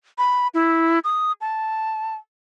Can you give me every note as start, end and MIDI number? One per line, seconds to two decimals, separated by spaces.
0.18 0.48 83
0.54 0.99 64
1.04 1.32 87
1.41 2.16 81